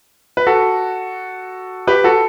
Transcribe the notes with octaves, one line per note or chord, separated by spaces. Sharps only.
B4
F#4 A4
G4 B4
F#4 A4